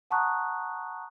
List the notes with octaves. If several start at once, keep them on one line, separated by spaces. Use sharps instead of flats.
F#5 A5 A#5 C#6 D#6 F#6